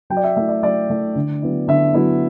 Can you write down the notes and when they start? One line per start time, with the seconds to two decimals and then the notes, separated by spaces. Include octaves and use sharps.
0.10 F#3 G5
0.17 D5
0.24 E5
0.36 A3 E4 E5
0.49 D5
0.63 F#3 D5
0.89 A3 E4
1.15 D3
1.42 F#3 B3 E4
1.68 D3 E5
1.94 F#3 B3 E4